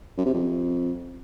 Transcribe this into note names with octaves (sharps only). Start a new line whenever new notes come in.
F#2
C3
F2